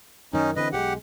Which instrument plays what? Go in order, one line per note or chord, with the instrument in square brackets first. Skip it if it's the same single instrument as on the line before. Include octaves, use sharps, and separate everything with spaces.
[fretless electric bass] F#2 D#3 [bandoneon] C#4 D#4
[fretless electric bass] D3 E3 C4 [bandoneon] B4 D#5
[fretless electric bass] B1 E3 G#3 [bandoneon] G4 F#5